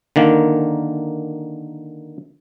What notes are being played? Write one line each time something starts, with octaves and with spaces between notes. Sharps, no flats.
D3 D#3 A#3